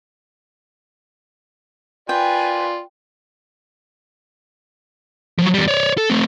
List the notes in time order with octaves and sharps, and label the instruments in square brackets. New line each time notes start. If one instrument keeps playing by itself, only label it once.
[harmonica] F4 D5 [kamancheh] B4 G#5 [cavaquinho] G5
[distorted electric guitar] F3 F#3
E2 G3
C#5 D5
A4
A3 C4